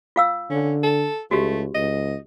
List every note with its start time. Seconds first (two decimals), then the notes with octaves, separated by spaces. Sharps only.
0.16 F4 F5 E6
0.50 D3 C#4
0.83 A4
1.31 C#2 A3 F#4 G4
1.75 C#2 D#5